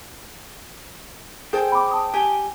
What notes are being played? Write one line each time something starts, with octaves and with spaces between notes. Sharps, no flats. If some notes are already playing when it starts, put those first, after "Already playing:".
G#4 A4 C5 G5
B5 D6
A5 D#6
G4 G#5